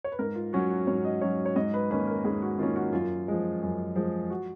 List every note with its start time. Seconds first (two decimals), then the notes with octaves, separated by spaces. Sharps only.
0.04 C#5
0.12 B4
0.19 G#2 A#4
0.35 F4
0.53 F#3 C#4 F#4
0.70 F#4
0.87 G#2 C#5
1.05 D#5
1.21 F#3 C#4 C#5
1.46 C#5
1.56 G#2 D#5
1.74 B4
1.91 D#3 A#3 C#4 B4
2.07 A#4
2.25 G#2 G#4
2.42 F#4
2.58 D#3 A#3 C#4 F4
2.76 F#4
2.93 F#2 F4
3.28 F3 G#3
3.62 F#2
3.96 F3 G#3
4.30 F#4